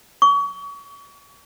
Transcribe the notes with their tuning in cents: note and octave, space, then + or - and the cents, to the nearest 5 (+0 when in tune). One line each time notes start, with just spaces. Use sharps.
C#6 +35